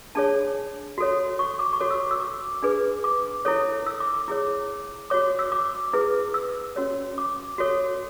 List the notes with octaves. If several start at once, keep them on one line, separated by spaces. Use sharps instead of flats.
D4 G#4 C#5 A5
F#4 A4 C#5
C#6
D6
C#6
F#4 A4 C#5 D6
E6
E6
D6
D4 G#4 B4
D6
E4 A4 C#5
E6
D6
D6
E4 G#4 C#5
F#4 C#5 D6
E6
D6
E4 G#4 B4
E6
C#4 F#4 C#5
D6
F#4 A4 C#5